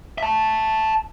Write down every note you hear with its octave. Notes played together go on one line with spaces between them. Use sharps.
E5 A5